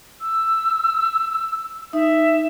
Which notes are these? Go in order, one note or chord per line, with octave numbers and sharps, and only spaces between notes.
E6
D#4 E5